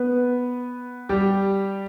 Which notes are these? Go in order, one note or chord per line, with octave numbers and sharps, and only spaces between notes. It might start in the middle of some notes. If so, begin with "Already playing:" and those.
Already playing: B3 B4
G3 G4